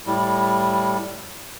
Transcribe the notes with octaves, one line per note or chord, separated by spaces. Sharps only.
A2 G3